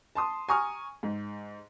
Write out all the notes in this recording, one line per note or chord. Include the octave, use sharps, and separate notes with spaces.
A5 C6 D#6
G#5 A#5 C#6 D#6 F6
G#2